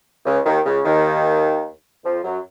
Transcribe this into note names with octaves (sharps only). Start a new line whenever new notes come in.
C#2 C#3
D#2 D#3
C#2 C#3
D#2 D#3
F2 F3
F#2 F#3